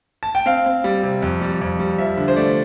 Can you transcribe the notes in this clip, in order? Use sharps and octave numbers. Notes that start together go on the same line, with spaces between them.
A5
G5
C4 F5
C4
G3
C3
F2
G3
F2
G3
F3 E5
D3
C5
A3 D5